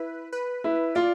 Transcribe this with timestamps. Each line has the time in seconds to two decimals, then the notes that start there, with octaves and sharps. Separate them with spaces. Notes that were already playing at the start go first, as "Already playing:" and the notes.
Already playing: E4 B4
0.32 B4
0.64 E4
0.95 F4 D5